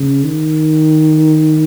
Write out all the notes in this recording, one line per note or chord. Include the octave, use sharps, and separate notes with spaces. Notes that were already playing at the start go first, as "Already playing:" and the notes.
Already playing: C#3
D#3